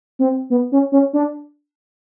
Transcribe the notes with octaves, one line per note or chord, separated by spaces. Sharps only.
C4
B3
C#4
C#4
D4